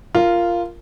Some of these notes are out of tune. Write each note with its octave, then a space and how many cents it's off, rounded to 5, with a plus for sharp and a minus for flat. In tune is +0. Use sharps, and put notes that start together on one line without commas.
F4 -10 A#4 -5